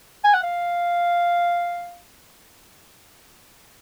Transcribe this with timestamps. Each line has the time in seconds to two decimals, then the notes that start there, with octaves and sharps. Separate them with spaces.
0.24 G#5
0.34 F#5
0.43 F5